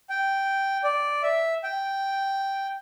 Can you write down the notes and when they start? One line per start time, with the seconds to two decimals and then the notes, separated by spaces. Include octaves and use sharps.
0.10 G5
0.84 D5
1.23 E5
1.63 G5